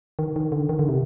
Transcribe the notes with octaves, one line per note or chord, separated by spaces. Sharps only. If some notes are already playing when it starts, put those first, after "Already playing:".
D#3
D#3
D3
D#3
D3
C3